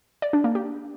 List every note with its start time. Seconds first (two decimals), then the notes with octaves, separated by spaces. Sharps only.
0.22 D5
0.33 D4
0.44 A#3
0.55 G4